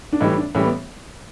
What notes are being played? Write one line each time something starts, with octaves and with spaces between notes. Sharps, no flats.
D4
A2 E3 G3 D#4
D4
A2 E3 G3 C#4
B3